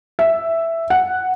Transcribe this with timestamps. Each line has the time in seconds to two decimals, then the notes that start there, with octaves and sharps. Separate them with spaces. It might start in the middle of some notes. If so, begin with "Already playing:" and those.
0.19 E5
0.90 F#5